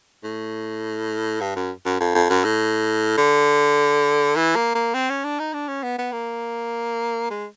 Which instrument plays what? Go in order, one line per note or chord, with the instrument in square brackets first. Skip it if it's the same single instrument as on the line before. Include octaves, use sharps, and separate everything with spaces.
[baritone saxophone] A2
G2
F#2
F#2
F2
F2
F#2
A2
D3
E3
A#3
A#3
C4
C#4
D4
D#4
D4
C#4
B3
B3
A#3
G#3